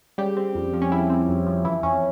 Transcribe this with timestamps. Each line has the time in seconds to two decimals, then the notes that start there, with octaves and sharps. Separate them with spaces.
0.18 C#3 G3 G4
0.37 C4
0.55 F2
0.73 F3
0.82 C#4
0.91 C#3 E4
1.10 C4
1.29 F2
1.47 F3
1.65 E3 E4
1.83 F2 C#4